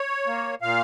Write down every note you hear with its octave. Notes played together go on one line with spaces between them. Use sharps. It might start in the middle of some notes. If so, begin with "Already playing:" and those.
Already playing: C#5
A#3
A#2 F5